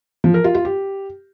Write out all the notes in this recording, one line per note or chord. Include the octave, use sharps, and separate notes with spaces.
F3
A#4
F4
F4
G4